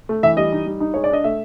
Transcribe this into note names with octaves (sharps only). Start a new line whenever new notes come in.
A3
E3 E5
G3 D#5
D#4
G3
D#4
G#3 C#5
D5
D4 D#5
A3 E5